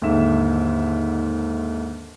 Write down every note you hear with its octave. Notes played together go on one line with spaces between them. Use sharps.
D#2 G#2 D3 E5 E7